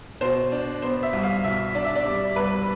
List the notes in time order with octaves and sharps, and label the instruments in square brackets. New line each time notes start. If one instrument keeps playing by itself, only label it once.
[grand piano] B2 C5
D4
B3 C5
E5
C2
F5
B2 E5
D4 D5
E5
D5
G3
C2 B4